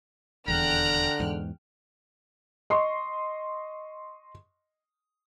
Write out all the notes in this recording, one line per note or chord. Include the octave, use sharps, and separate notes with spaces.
D#1 E2 D3 G5 A#5 F6 F#6
E2 G#2
D#5 C6 C#6